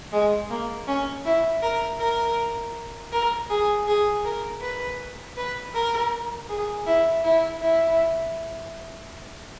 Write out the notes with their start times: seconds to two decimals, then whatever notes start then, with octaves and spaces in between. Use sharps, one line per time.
0.13 G#3
0.50 A#3
0.87 C#4
1.25 E4
1.62 A#4
2.00 A#4
3.12 A#4
3.50 G#4
3.87 G#4
4.25 A#4
4.61 B4
5.37 B4
5.74 A#4
6.49 G#4
6.86 E4
7.24 E4
7.62 E4